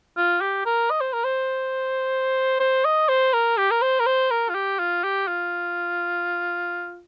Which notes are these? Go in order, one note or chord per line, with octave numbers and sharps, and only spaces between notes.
F4
G4
A#4
D#5
C5
A#4
C5
C5
D#5
C5
A#4
G4
A#4
C5
A#4
C5
A#4
F4
G4
F4
G4
F4